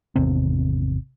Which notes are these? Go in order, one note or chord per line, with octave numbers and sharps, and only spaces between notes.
G#1 E2 C3 C4